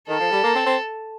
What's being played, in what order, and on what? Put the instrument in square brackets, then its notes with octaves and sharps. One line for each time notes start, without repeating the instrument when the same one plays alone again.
[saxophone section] D#3 [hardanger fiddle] A4
[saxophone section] F3
G3
A#3
C4
C4